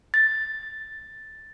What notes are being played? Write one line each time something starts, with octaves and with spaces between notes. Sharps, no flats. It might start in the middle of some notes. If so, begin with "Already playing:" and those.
A6